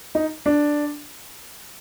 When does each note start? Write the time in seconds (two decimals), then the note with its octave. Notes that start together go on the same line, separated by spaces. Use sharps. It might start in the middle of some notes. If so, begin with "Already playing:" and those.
0.15 D#4
0.46 D4